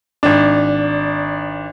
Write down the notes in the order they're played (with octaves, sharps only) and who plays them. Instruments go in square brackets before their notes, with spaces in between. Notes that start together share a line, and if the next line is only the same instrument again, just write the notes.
[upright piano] G#1 D4